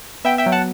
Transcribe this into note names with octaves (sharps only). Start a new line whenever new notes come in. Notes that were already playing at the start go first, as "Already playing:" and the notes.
B3 E5 G5
E5 G5
F#3
F#5 A5